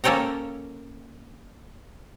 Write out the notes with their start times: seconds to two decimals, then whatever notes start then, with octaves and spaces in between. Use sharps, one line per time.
0.04 A#3 C#4 A4 C#5 G5 A#5